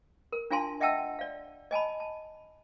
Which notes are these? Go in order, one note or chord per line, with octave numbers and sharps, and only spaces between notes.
A#4
D4 F4 F5 G#5 A5 C6
D#5 E5 F#5 G5 A5 E6
D5 F5
D#5 G#5 A5 B5
A5